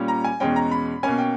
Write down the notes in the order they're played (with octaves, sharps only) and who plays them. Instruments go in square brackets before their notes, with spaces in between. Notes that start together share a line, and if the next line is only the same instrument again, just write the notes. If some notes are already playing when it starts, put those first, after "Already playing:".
Already playing: [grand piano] A#2 G3 C#4
A#5
G#5
E2 B2 G#3 C#4 G5
A#5
B5
B2 A#3 C#4 G#5
G5